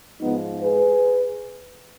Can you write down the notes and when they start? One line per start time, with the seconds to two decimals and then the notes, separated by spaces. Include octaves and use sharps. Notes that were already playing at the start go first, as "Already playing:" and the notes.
0.20 G#2 F3 G#3 B3 D#4
0.61 G#4 B4